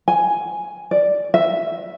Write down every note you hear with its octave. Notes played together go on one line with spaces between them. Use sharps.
G#5
D5
E5